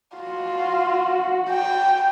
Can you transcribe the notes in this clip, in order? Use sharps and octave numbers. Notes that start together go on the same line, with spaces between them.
F4 F#4
G5